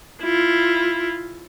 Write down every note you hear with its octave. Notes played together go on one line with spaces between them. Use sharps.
E4 F4